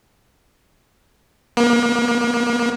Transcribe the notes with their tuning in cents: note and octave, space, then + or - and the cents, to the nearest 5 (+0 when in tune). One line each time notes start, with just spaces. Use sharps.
A#3 +40